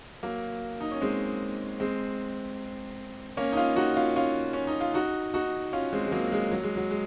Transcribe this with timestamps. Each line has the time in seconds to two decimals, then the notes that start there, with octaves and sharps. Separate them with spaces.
0.23 F#3 A#3
0.81 D#4
0.91 C#4
1.01 G#3 C4
1.80 G#3 C4
3.37 A#3 C#4
3.52 D#4
3.57 C#4 F4
3.76 D#4 F#4
3.96 C#4 F4
4.16 C#4 F4
4.53 C#4
4.67 D#4
4.81 F4
4.94 D#4 F#4
5.34 D#4 F#4
5.73 C#4 F4
5.93 G#3 C4
6.07 G#3
6.12 F#3 A#3
6.32 G#3
6.52 F#3
6.63 G#3
6.76 F#3
6.91 G#3